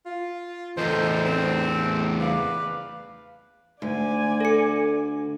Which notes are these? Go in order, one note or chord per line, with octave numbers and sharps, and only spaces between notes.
F4
E2 A3 D#4 C5
C4
B4 D5 F5
D2 D5 G#5
A4 C#7